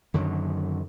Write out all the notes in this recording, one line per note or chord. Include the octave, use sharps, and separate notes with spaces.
F#2 D3 D#3 F#3